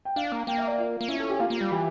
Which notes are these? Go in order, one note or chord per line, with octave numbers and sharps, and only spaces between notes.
G5
D4 F5
A#3
A#3 G5
E5
D5
F4
A#3
C#4 E4
A4
G4
A#3 F4
A#3
G3
E3 G4